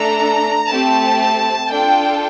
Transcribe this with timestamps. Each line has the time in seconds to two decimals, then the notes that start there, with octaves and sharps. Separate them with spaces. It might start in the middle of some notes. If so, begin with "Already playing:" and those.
Already playing: A3 D4 A4 A#5
0.69 A3 C4 G4 A5
1.70 D4 F4 A4 G5